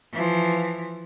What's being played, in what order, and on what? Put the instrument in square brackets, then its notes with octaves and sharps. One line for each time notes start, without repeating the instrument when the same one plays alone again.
[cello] E3 F3